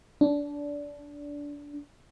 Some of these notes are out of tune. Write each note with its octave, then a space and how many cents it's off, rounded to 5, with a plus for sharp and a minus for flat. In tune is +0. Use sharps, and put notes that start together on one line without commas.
D4 -20